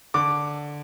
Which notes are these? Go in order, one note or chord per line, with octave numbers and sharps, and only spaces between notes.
D3 D6